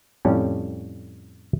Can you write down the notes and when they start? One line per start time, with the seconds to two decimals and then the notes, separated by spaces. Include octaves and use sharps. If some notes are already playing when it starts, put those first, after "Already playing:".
0.25 F2 A2 G3 C#4